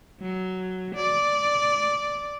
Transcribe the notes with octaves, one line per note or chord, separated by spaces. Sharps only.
F#3
D5